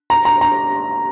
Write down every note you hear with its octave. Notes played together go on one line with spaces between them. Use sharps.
A#5
A#5
A#5